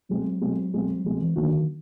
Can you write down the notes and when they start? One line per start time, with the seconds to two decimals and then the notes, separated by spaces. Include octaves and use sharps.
0.09 B2 F#3 G#3 C4
0.41 B2 G#3 C4
0.73 B2 G#3 C4
1.04 B2 F3 G#3 C4
1.20 E3
1.36 D3 D#3 F#3 A#3 D#4 F#4